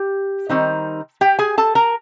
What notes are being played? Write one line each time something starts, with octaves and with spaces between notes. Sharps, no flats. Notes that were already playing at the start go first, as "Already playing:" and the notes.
Already playing: G4
D#3 G3 C4 D#4
G4 G5
G#4 G#5
A4 A5
A#4 A#5